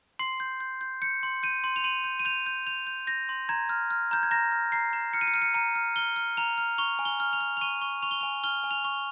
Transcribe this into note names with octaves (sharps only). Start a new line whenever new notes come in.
C6 C7
G6
G6
G6
G6 C#7
C6
G6 D#7
C6
F7
C6 D#7
G6
D#7
G6 F7
G6
G6 F7
G6
G6 A#6
C6
A#5 G#6
F6
F6
A#5 G6
G#6
A#5 A#6
F6
A#5 C7
A#5
F6 C#7
D#7
C#7
F6 D#7
C#7
A#5 D#7
F6
F6 G7
F6
A#5 F7
F6
C#6 F7
G#5
G7
F6
F7
F6
F7
C#6 D#7
C#6
C#6 F7
G7
G#5 F7
F6 G7
G#5
F7
C#6